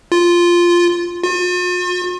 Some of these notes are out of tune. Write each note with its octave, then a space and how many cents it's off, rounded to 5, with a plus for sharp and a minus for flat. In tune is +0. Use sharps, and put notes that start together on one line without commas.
F4 -5
F4 +45